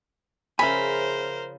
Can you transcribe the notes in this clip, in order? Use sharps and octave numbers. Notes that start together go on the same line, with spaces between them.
C#3 F3 C#4 A#4 C5 E5 G#5 B5